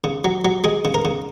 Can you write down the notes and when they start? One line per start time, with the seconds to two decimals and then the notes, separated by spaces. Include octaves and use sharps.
0.04 C#3
0.24 F#3
0.45 F#3
0.64 G#3 G#4
0.85 C#3
0.94 A#4
1.05 C#3